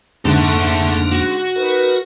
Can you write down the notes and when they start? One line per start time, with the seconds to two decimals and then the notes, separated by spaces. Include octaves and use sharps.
0.25 F2 G#2 D3 A3 A#3 A4 F#5
1.12 F#4
1.56 D#4 A#4 B4